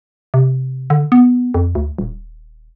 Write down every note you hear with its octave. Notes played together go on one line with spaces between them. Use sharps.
C3
D3
B3
F2
D2
D#1